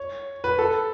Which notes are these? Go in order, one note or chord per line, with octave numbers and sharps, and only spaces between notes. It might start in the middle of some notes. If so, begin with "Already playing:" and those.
Already playing: C#5
B4
A4